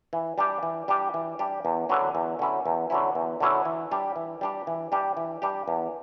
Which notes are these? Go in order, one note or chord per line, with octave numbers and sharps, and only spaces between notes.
E3
G3 D4 G4
E3
G3 D4 G4
E3
G3 D4 G4
E2
D3 F#3 C#4 E4
E2
D3 F#3 C#4 E4
E2
D3 F#3 C#4 E4
E2
D3 F#3 C#4 E4
E3
G3 D4 G4
E3
G3 D4 G4
E3
G3 D4 G4
E3
G3 D4 G4
E2